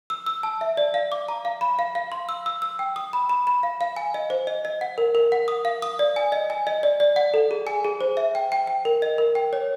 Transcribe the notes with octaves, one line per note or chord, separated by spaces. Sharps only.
E6
E6
A5
E5
D5
F5
D6
A#5
F5
B5
F5
F5
C6
E6
E6
E6
G5
D#6
B5
B5
B5
F5
F5
G#5
D#5
C5
D#5
D#5
F#5
A#4
A#4
F#5
D#6
F5
D#6
D5
G#5
D#5
G#5
D#5
D5
D5
F#5
A4
G#4
G#5
G#4
C5
E5
G5
G5
G5
A#4
D#5
A#4
G5
C#5